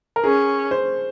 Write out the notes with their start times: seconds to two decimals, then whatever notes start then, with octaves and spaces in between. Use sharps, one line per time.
0.16 A#4
0.24 C#4 G#4
0.71 C5